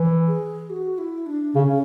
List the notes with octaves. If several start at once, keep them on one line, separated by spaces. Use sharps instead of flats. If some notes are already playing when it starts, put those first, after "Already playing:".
Already playing: E3
G#4
F#4
E4
D4
C#3 C#4